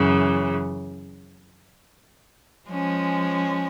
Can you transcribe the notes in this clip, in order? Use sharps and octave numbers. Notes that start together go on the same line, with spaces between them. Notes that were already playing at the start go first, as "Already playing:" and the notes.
Already playing: F#2 C#3 E3
F3 G#3 C#4